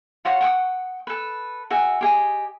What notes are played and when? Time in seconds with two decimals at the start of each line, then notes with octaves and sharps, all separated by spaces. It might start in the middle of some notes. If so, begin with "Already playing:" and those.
0.25 F4 F#4 C#5 F#5
0.41 F#5 G5 C#6 D#6
1.07 A4 B4
1.70 F#4 G#4 E5
2.01 G4 G#4 D#5